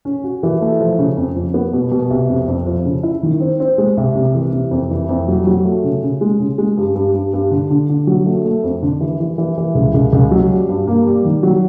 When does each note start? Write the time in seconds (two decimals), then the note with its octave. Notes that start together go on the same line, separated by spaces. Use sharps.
0.05 C#4
0.24 F#4
0.43 E3
0.61 A3
0.80 F3
0.99 C#3
1.17 F2
1.36 F3
1.54 B3
1.73 B2
1.92 B2
2.10 C2
2.30 F2
2.48 F2
2.67 F3
2.85 C#3
3.03 E4
3.23 D#3
3.41 C4
3.60 C4
3.78 G#3
3.97 C2
4.15 C3
4.35 E3
4.53 C3
4.71 F2
4.91 E3
5.09 F2
5.28 F#3
5.47 F#3
5.65 A3
5.84 C#3
6.03 C#3
6.21 G#3
6.40 C#3
6.58 G#3
6.77 G2
6.95 G2
7.14 G2
7.33 G2
7.51 D3
7.70 D3
7.89 D3
8.07 F#3
8.26 A3
8.45 A3
8.64 F2
8.82 D3
9.01 E3
9.20 E3
9.38 E3
9.57 E3
9.75 C#2
9.94 C#2
10.13 C#2
10.31 F#3
10.50 G3
10.69 G2
10.87 A#3
11.07 G3
11.25 D#3
11.43 F#3